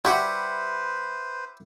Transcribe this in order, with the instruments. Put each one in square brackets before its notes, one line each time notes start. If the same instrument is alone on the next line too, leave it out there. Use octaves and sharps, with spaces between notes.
[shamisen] G3 F#4 [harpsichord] E4 G4 F#5 [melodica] B4 C5